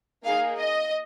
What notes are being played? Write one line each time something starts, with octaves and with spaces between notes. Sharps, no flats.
A#3 D#4 G#4 F5
D#5